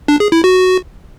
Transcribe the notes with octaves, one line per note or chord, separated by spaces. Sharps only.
D4
G#4
E4
F#4